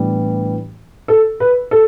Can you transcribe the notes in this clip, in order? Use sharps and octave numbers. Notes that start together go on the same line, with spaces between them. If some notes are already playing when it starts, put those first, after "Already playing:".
Already playing: A2 E3 G3 B3 D4
A4
B4
A4